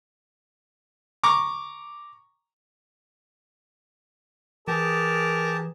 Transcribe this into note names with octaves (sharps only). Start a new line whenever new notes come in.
A#5 C#6 D6
E3 G4 G#4 A#4 A5